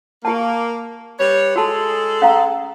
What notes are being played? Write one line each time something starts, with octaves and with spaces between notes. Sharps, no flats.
A#3 G4 A5
G3 B4 C#5
G#3 F#4 G#4 A4 A5
C#4 F5 A#5